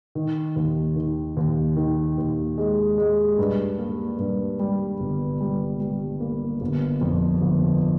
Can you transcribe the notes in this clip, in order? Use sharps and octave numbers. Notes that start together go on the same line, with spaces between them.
D#3
D#2
D#3
D#2
D#3
D#2
G#3
G#3
G2
A#3
G2
G3
G1
G3
G3
A#3
G1
F2
G1